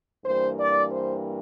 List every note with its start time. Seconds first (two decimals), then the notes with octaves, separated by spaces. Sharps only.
0.24 G2 E3 G3 A#3 C5
0.58 D5
0.91 C5